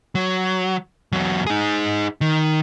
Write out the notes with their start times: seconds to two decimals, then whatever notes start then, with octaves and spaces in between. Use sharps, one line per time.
0.15 F#3
1.12 E2 F#3
1.47 D#4 G#4
2.21 D#3